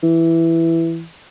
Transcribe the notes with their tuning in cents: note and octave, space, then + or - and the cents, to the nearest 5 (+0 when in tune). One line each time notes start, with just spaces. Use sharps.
E3 +5